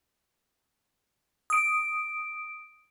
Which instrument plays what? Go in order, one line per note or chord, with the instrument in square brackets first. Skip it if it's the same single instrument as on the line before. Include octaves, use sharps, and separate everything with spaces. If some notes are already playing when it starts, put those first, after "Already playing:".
[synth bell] D#6 D7